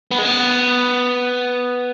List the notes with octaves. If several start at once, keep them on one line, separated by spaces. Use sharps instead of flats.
B3
G#3
B3